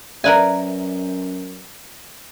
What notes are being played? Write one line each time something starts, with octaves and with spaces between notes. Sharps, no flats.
F#2 A#4 B4 D5 E5 G#5